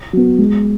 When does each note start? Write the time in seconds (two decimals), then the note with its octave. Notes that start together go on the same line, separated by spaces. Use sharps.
0.13 F#3 B3
0.39 G#3